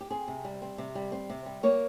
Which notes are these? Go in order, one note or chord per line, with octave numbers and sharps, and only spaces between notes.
G4
C4 G#4
C3
G3
C4
C3
G3
C4
C3
G3
A#3 C#5